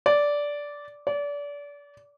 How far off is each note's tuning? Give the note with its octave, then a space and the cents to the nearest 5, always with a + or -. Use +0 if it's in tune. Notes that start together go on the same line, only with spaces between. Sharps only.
D5 -10
D5 -30